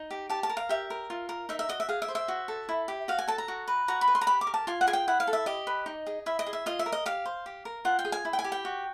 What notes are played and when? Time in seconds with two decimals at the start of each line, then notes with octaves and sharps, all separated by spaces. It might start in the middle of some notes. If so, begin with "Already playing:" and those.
Already playing: D#4
0.11 G4
0.30 G4 A5
0.43 A5
0.50 A#4
0.57 F5
0.69 G4 E5
0.90 A#4
1.10 F4
1.29 A#4
1.49 D#4 E5
1.59 E5
1.69 F#4 D#5
1.80 E5
1.89 G#4 F5
2.02 E5
2.08 C5
2.15 E5
2.28 F#4
2.48 A4
2.69 E4
2.88 G4
3.08 F#4 F5
3.19 G#5
3.28 A4 A5
3.38 A#5
3.48 F#4
3.68 B4
3.88 F#4 A#5
4.01 B5
4.08 B4
4.15 C6
4.21 A#5
4.27 G4 B5
4.41 D6
4.47 A#4
4.54 A5
4.67 F4 G#5
4.81 F#5
4.87 G#4 G#5
4.93 G5
5.08 E4 F#5
5.20 F5
5.27 A4
5.33 E5
5.46 G4 D#5
5.67 B4
5.86 D#4
6.07 G#4
6.26 E4 E5
6.39 D#5
6.47 G#4
6.53 E5
6.66 F4 D#5
6.79 E5
6.86 A#4
6.92 D#5
7.06 G4 F5
7.26 C5
7.46 G4
7.65 A#4
7.85 F4 F#5
7.99 G5
8.05 G#4
8.12 G#5
8.25 E4
8.33 G5
8.39 G#5
8.44 G4
8.52 G5
8.65 F#4